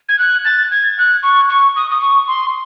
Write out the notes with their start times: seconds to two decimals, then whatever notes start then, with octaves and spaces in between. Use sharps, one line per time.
0.09 G#6
0.19 F#6
0.45 A6
0.71 G#6
0.98 F#6
1.23 C#6
1.50 C#6
1.76 D#6
1.91 D#6
2.01 C#6
2.28 C6